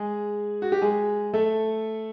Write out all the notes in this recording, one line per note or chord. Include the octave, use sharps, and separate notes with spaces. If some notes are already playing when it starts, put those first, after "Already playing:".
Already playing: G#3 G#4
F#4
G4
G#3 G#4
A3 A4